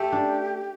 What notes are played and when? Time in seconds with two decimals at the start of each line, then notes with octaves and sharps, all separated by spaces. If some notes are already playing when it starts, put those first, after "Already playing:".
Already playing: A3 G4
0.12 D4